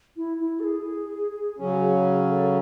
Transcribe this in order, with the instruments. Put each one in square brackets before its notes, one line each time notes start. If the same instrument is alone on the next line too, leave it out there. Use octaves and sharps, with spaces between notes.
[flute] E4
E4
A4
G#4
[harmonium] C#3 F#3 C#4
[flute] A4